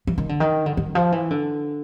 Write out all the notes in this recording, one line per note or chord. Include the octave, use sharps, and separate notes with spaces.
E3
D#3
D3
D#3
D3
D#3
F3
E3
D3